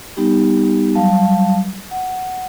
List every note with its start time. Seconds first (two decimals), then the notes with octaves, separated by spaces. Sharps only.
0.17 G3 B3 D#4 G4
0.95 F#3 G3 F5 A5
1.91 F#5